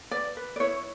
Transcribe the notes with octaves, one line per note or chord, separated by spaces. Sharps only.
B4 D5
B4
D5
E4 C#5